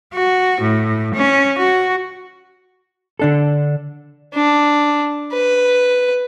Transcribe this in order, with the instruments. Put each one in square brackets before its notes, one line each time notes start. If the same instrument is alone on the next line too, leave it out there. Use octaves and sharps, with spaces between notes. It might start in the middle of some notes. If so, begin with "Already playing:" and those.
[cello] F#4
A2
C#4
F#4
[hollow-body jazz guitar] D3 D4 A4
[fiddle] D4
B4